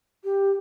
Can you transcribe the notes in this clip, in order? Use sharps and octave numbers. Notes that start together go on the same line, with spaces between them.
G4